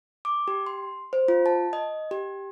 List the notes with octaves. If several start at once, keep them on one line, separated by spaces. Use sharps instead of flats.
D6
G4
C6
C5
F4
A5
D#5
G4